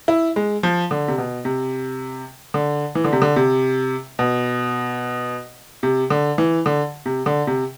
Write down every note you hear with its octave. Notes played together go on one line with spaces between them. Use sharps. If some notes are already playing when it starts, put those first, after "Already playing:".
E4
G#3
F3
D3
C3
B2
C3
D3
E3
D3
C3
D3
C3
B2
C3
D3
E3
D3
C3
D3
C3